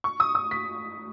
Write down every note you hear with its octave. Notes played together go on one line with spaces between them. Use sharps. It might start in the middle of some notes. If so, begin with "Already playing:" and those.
C#6
D#6
D#6
B6